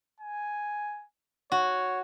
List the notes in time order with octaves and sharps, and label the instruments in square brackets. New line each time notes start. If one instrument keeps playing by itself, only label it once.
[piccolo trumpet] G#5
[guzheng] F#4 [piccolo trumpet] C#5